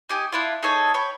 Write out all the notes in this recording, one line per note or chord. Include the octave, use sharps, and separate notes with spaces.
D#4 G4 G#5
D4 E4 F4
D#4 G#4 A4 C#5
C#5 G5 B5